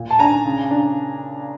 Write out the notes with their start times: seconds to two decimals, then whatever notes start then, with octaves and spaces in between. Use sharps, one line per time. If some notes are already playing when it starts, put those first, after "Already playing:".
Already playing: A#2
0.11 A5
0.19 D4 G#5 A#5
0.45 C#3
0.71 D4